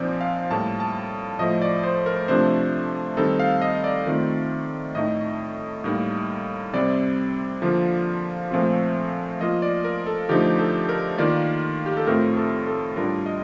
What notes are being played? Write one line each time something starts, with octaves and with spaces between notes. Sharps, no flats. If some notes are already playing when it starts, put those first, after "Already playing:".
Already playing: A#2 F3 C4 D#4 C5 D5
F5
A2 G3 A#3 A5
A5
A2 F3 A3 D#5
D5
C5
A#4
C3 F3 A3 D4 C5
D#3 G3 C4 D#4 A4
F5
D#5
D5
D#3 A3 C4 F4
A2 A3 D#4 D#5
A2 G3 A#3 D#4
C3 G3 C4 D5
D3 F3 A#3 F4
A#2 F3 A3 C4 F4
F3 A#3 F4 D#5
D5
A#4
A4
D3 F3 A3 D#4 G4
A4
A#4
D#3 A#3 F4 D5
G4
A4
A2 A3 C4 F4 A#4
A4
A4
A2 G3 D4 F4 A#4
D#5